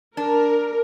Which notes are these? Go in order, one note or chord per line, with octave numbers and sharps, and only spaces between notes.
D4 A#4